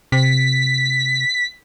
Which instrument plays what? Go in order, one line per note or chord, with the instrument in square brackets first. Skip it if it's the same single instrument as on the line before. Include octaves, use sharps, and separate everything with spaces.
[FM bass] C3 [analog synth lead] B6